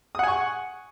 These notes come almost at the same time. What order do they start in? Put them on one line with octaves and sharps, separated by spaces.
D#6 F#5 G#5 C#6